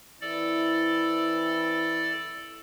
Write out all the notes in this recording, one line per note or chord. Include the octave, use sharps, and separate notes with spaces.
E3 C4 E4 A4 D5